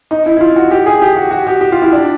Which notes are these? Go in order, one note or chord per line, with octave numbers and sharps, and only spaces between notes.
D#4
E4
E4
F4
F#4
G4
G#4
G4
F#4
F#4
G4
G4
F4
E4
D4